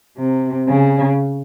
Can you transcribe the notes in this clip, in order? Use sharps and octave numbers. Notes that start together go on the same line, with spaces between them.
C3
C#3